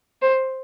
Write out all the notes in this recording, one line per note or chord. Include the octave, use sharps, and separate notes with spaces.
C5